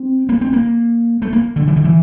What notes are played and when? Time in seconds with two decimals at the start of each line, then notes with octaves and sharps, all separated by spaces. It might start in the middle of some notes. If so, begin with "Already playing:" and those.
Already playing: C4
0.29 A#3
0.41 C4
0.53 A#3
1.22 A3
1.33 A#3
1.56 D3
1.68 E3
1.76 D3
1.84 E3